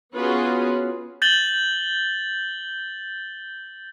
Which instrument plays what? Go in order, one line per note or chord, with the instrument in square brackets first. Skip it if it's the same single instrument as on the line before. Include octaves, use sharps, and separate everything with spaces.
[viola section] B3 C#4 F4 F#4 G#4 B4
[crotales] G6 A6 F#7 G7